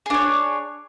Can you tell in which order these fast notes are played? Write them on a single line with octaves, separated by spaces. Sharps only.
G#4 D4 C#5